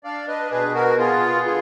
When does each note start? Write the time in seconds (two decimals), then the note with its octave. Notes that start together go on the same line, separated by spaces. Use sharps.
0.04 D4 D5 F5
0.28 B4 D#5
0.51 B2 G#4 B4
0.75 F#4 A#4
0.98 B3 F4 G#4
1.45 D3 F4 G#4